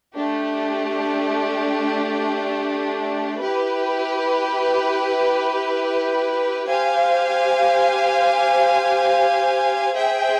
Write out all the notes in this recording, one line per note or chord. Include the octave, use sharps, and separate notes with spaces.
A3 D4 G4
E4 G4 B4
G4 C5 F5 G#5
G#4 C5 E5 G5